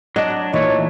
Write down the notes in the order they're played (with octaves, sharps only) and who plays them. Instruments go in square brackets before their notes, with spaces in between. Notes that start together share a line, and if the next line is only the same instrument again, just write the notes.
[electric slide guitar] F#3 D4 [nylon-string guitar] D#5
[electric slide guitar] A#2 A3 [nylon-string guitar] E3 [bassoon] D#4 [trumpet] C#5